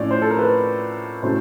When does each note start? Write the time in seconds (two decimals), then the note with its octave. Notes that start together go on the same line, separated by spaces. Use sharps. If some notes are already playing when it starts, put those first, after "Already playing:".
Already playing: A2 F3 A3 C#4 D5
0.11 C5
0.22 A4
0.30 A#4
0.39 B4
1.23 A2 F#3 A3 C#4 C5